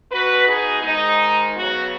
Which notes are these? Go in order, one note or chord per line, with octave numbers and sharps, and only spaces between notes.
B2 B3 F#4 B4
D#4 G#4
G#2 D#3 G#3 D#4
C#3 F#3 B3 F#4